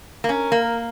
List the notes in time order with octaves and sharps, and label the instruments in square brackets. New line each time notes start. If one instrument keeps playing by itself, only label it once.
[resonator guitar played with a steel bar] A#3
[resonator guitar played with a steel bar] C#4 [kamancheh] A#4
[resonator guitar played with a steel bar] A#3